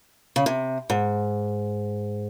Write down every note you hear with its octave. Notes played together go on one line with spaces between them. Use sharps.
C#3
C3
G#2